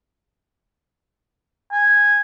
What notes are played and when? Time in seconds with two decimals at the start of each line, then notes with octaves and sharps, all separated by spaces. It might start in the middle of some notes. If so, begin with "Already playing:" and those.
1.72 G#5